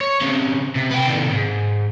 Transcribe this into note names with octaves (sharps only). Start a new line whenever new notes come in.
C#5
C#3 C4
C3
B3 G5
C3 D#3
G#2